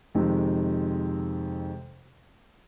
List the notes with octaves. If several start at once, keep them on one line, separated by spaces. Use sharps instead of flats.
F2 C3 D#3 G#3